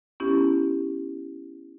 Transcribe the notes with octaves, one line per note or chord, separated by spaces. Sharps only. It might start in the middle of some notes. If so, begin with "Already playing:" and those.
B3 C#4 E4 G4